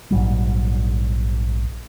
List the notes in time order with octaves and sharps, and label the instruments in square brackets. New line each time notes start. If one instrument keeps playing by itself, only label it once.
[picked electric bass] A#1 G#2 F#3 G3